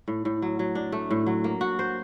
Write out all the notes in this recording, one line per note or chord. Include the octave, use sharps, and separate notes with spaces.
A2
A2
F#3
F#3
D4
A3
A2
F#3
A#3
F#4
C5